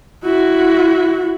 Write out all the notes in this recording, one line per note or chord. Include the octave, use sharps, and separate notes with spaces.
E4 F#4